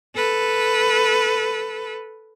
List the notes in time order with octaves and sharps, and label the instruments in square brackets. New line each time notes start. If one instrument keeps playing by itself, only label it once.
[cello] A4 B4